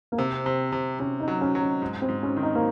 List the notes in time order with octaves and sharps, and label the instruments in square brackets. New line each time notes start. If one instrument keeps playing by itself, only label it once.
[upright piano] A#3
[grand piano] C3 [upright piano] C4
[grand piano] C3
C3
[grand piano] C3 [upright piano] C#4
[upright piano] D#4
[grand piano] F#3
[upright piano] C#4
[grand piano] F#3
[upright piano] C#4
[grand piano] G#2
[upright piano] C4
[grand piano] G#2
[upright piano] C#4
[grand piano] D#3
[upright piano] D#4
A#3